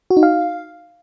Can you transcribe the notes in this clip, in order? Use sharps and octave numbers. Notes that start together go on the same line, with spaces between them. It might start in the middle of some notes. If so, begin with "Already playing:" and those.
F#4
D#4
F5